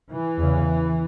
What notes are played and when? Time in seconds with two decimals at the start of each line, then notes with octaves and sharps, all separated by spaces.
0.10 E3
0.38 E2 C#3